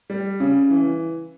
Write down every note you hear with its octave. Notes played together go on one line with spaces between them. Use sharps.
G3
C#3
E3